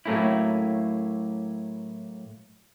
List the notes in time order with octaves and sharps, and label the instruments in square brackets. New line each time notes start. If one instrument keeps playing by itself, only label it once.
[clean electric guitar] A2 F#3 A3 A#3 C#4 E4